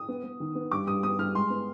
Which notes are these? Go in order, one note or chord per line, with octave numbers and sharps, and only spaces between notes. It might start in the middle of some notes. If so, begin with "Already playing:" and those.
Already playing: D#6
B3
B3
D#3
B3
G2 D6
G2 D#6
B3 D#6
G2 F6
G#3 C6
B3